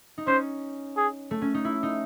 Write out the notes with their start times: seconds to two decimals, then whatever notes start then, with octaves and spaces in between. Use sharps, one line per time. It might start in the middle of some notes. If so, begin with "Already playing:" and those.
0.18 D#4
0.27 C#4 C5
0.97 G#4
1.31 A3
1.42 C#4
1.54 D#4
1.65 E4
1.83 D#4